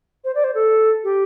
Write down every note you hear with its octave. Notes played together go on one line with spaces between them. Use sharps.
C5
D5
C5
A4
G4